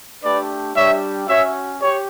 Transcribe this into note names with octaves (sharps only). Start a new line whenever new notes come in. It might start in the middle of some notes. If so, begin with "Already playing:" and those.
A3 D4 G4 B4 D5
G3 D4 G4 C#5 E5
C#4 F#4 C#5 E5
G4 C#5